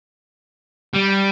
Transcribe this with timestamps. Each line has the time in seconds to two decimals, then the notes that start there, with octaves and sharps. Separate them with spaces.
0.94 G3